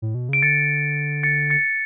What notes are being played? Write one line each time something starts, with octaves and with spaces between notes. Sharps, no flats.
A2
B2
C#3 D7
D3 A6 C#7
A6 C#7
A6 C#7